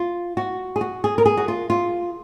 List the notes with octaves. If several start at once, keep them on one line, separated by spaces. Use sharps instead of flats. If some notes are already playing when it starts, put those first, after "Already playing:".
Already playing: F4
F#4
G#4
F#4
G#4
A#4
G#4
F#4
F4
F4